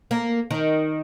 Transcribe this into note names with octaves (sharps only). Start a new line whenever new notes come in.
A#3
D#3